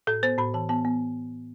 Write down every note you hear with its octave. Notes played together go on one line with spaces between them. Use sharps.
A2 A4
B3 C5
A2 B5
E3 A5
B3 A5
B3